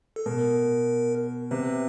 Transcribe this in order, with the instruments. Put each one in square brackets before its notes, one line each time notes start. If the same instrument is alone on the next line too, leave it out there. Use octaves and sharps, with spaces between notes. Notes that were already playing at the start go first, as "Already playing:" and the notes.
[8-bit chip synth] A4
[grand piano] B2 [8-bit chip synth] A#4
[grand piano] C3 [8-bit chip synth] B4